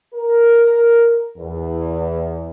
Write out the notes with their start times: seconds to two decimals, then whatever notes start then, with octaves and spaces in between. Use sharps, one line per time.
0.15 A#4
1.37 E2